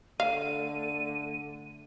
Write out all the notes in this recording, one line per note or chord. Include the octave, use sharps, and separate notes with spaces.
D3 A3 F5 D#7